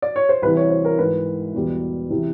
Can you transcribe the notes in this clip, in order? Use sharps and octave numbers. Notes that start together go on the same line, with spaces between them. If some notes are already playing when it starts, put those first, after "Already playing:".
D5
C#5
C5
C2 C3 E3 B4
C#5
C5
A#4
G#2 E3 G#3 B4
E2 B2 G3
C3 E3